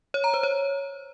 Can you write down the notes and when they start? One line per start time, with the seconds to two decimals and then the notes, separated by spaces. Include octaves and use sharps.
0.14 C#5
0.24 A#5
0.34 C5
0.43 C#5